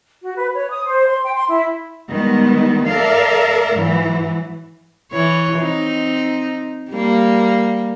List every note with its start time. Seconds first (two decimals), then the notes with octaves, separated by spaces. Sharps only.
0.22 F#4
0.37 B4
0.54 C#5
0.70 D#6
0.84 C5
1.07 C6
1.22 G5
1.35 C6
1.49 E4
2.09 D#3 G3 G#3 B3
2.86 A4 A#4 D5 E5 F5
3.75 G#2 E3 F#3
5.12 E3 C#5
5.60 C4 D#4
6.90 G3 A#3